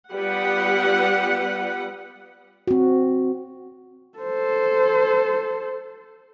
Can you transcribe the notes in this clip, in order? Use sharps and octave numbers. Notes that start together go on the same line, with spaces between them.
G3 B3 F4 G4 B4 F#5
C4 F#4
A4 C5